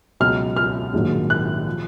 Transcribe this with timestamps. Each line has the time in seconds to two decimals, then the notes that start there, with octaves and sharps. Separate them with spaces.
0.20 C#2 B2 F#3 F6
0.57 F6
0.93 A#1 G#2 D#3 F#3
1.30 F#6
1.66 F3